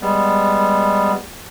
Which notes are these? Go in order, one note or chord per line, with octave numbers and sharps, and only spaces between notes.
G3 G#3 B3